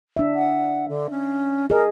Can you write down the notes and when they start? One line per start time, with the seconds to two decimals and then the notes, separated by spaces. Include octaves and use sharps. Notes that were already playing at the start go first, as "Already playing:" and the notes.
0.17 D4 E5
0.35 F#5
0.88 D3
1.10 C#4
1.70 G#4 A#4 D#5